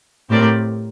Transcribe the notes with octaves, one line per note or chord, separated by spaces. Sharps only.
A2 C4 G4 A#4 D5